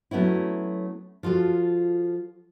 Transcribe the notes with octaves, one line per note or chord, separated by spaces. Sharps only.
F#3 A3 B3 C#4 E4
F3 F4 F#4 A4